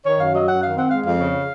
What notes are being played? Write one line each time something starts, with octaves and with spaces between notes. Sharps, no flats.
D#3 C#5
F#2 F5
F#3 D#5
F#2 F#5
D#3 F5
C4 F#5
G#3 F5
F2 F5
C#3